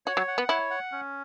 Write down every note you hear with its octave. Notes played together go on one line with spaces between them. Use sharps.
F#4 C#5
F#3
F#5
B3
E4 C#5
F#5
C#4